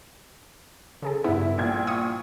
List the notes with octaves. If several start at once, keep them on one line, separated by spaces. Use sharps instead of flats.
C#3 G#4 A4
G2 B3 E4
A#1 A#2 G#6
F5 C#6 D#6